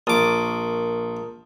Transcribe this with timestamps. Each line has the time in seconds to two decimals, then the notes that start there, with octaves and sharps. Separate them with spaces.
0.07 A#1 A#4 A5 D6 D#6